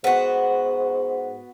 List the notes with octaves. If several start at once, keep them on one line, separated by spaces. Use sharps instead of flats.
G#2 B3 F#4